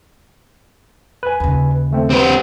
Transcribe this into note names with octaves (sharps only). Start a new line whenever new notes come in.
B4 G#5
D#2 C#3
D#3 A3 C4
C4 G4 B4 C6